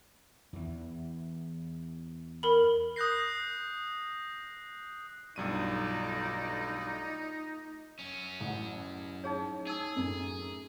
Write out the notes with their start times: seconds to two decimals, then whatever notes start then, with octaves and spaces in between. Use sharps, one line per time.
0.53 E2 E3
2.43 A#4 B5
2.96 D#6 F#6 G6 A#6 C7
5.36 B1 G2 A3 D#4 F4 D5 D#7
7.99 F#2 C#4
8.40 A1 F#5
9.24 D#4 G#4 C#5
9.67 D#4 G#4 E6
9.96 F#2 A2